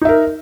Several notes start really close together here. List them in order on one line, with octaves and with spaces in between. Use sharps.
D#4 E5 A#4